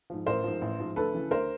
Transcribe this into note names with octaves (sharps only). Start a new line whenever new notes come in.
G#2 F3
A1 A#4 C5
G#2 F3
A1
G#2 F3
D2 A4 B4
C#3 E3
D2 A#4 C5